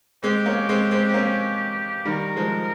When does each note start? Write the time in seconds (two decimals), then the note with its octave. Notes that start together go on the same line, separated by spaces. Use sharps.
0.23 G#3 C4 G4
0.46 A#3 C#4
0.69 G#3 C4
0.91 G#3 C4
1.09 C4
1.14 A#3 C#4
2.05 D#3 G3 A#4
2.36 F3 G#3